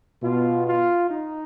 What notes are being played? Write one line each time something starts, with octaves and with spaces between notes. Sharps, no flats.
B2 F4
F4
D#4